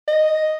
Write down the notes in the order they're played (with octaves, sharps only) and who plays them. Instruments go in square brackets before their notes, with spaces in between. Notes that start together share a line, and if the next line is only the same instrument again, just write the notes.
[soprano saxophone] D#5